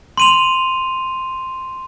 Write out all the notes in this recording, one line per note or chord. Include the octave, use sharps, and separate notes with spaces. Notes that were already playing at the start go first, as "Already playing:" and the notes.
C6 D#7 F7